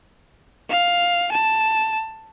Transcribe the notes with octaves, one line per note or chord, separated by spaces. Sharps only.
F5
A5